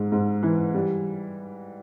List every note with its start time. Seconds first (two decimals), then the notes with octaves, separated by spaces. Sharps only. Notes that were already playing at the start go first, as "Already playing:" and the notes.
Already playing: G#2
0.12 G#2
0.43 E3
0.74 G3